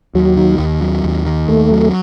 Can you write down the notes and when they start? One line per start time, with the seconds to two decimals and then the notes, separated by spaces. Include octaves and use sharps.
0.15 D#2 F#3
0.37 D#3
0.59 D#2
0.82 F#3
1.04 D#2
1.26 D#3
1.48 D#2 A3
1.71 F#3